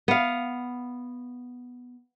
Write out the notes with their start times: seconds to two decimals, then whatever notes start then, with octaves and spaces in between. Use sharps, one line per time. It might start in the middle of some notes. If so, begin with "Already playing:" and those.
0.08 B3 F5